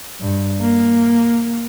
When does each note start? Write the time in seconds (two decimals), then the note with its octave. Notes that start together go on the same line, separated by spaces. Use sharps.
0.21 G2
0.61 A#3